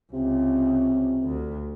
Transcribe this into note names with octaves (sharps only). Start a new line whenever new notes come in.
C#2 C3
D2